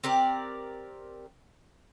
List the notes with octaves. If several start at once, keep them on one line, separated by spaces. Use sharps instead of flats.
C4 G4 A#4 D5